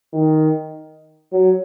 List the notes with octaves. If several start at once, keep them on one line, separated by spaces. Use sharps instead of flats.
D#3
F#3